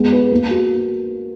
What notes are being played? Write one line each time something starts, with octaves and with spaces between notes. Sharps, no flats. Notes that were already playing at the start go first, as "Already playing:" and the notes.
Already playing: G#3 B3
B4
A#3
F#4